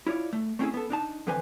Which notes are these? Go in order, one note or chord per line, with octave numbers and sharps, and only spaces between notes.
E4 F4 C#5 D5
A3
A3 C4 C#4 D#4 E4 G#4
B3 A4
D4 D#4 A5
F2 D3 E3 B4 C5 G#5